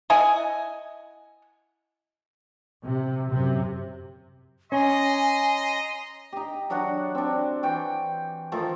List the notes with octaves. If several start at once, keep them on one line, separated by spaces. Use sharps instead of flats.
E4 D#5 F#5 G#5
C3
F#2 C3
C#4 D#5 G#5 A#5 C6
D#4 G4
F#3 D4 F#4 F#5
C4 D4
E3 G5 C#6
D#3 F3 A3 A5